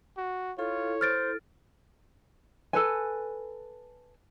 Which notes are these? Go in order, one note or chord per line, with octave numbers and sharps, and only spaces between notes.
F#4
E4 F4 A4 C#5
C5 F6 A6 D7
A4 B4 G#5